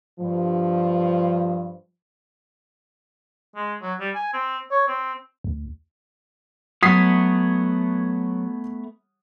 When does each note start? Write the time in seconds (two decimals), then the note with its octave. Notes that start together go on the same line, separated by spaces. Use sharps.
0.19 G2 F3
3.56 G#3
3.82 F#3
4.00 G3
4.15 G#5
4.34 C4
4.71 C#5
4.88 C4
5.44 D2
6.83 F#3 A3 B3 C#5 D#6 B6 C7